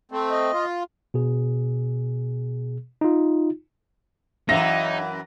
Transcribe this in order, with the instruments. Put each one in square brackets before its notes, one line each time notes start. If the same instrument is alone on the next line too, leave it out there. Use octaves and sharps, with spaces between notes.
[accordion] A3 C4
[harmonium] D#5
[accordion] F4
[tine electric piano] B2 G#4
D#4 F4
[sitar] F#2 E3 [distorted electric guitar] D#4 [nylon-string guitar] E5 F5 [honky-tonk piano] A#6